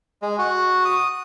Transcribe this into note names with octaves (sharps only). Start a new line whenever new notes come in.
G#3
F#4
D#6